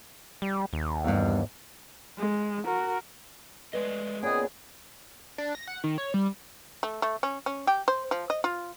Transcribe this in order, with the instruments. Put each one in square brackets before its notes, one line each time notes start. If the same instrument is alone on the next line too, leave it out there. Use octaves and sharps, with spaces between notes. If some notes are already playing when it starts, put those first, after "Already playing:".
[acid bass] G3
D#2
[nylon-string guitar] E2 G2
[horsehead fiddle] G#3
F#4 A#4
[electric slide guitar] G#3 A3 D#5 [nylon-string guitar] B4 D5
[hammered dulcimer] A#2 C#3 B3 [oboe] G#4 [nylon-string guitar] D#5 G5
[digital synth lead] D4
A#6
F#5
D#3
C#5
G3
[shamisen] A3
A3
C#4
C#4
G4
C5
F3
D#5
F4